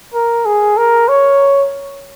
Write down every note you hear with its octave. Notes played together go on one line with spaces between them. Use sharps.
A#4
G#4
A#4
C#5